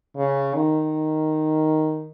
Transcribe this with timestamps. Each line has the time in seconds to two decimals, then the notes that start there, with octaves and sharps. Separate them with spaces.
0.17 C#3
0.55 D#3